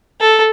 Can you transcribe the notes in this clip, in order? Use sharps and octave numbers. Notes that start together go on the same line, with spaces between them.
A4